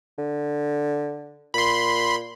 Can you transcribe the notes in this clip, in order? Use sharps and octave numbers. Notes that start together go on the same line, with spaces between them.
D3
A#2 B5 C6